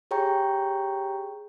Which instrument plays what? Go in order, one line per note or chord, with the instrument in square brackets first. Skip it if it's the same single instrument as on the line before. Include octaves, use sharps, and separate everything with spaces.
[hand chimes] G4 G#4 C#5 G5 A#5 C#6